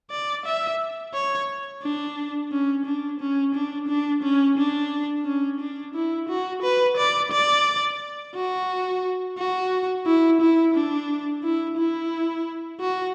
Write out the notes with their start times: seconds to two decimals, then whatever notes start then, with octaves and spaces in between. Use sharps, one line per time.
0.11 D5
0.45 E5
1.14 C#5
1.83 D4
2.51 C#4
2.85 D4
3.20 C#4
3.54 D4
3.88 D4
4.23 C#4
4.57 D4
5.26 C#4
5.60 D4
5.94 E4
6.29 F#4
6.62 B4
6.97 D5
7.31 D5
8.35 F#4
9.38 F#4
10.06 E4
10.41 E4
10.74 D4
11.43 E4
11.77 E4
12.80 F#4